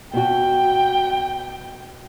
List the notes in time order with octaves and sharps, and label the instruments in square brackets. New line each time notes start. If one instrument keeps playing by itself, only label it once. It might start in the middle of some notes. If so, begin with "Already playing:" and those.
[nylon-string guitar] B2 F#4 [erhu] G5